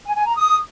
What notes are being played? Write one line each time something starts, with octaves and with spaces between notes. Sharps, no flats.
G#5
G#5
A#5
D#6